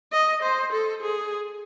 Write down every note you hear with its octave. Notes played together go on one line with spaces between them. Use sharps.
D#5
C5
A4
G#4